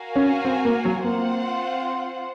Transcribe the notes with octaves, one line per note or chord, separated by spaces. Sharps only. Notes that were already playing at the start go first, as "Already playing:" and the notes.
Already playing: F#4 A#4 F5 G#5
C#4
C4
A#3
F#3
A#3 C4 F4 C5 F#5